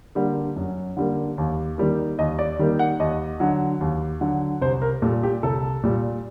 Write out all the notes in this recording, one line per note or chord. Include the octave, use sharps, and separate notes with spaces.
D3 G3 A#3
F#2
D3 G3 A#3
D#2
D#3 G3 A#3
D#2 D#5
D5
D#3 G3 A#3
F#5
D#2 D#5
D3 F#3
D#2
D3 F#3
C2 C5
A#4
A#2 G3 A4
G4
C2 A4
A#2 G3